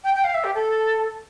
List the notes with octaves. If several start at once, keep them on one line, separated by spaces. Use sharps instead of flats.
G5
G5
F5
E5
G4
A4